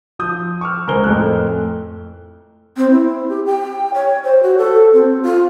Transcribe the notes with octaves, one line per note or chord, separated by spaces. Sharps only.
F3 D#6 G6
C#6 D6 E6 F6
C#2 A#4 C5 G#5 F6 G7
F2 A2 A3 A4 F#6
C4
E4
G4
G5
C#5
C5
F#4
A4
C4
F4